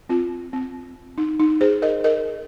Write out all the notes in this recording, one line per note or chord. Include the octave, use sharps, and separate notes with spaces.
C4 F4
C4
D#4
D#4
G#4 C5
A#4 D#5
A#4 D#5